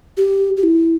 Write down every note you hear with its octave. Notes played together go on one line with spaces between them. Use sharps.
G4
G4
E4